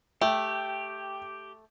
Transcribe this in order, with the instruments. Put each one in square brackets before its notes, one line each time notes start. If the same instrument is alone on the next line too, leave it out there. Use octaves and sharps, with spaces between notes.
[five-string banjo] A3 [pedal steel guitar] G4 [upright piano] G5